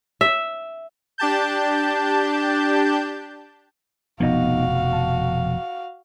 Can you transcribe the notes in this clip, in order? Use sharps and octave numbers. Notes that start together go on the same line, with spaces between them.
E5
D4 G4 A5 G6
F1 B2 F3 B3 D#4 F#4 D#5 F5
A5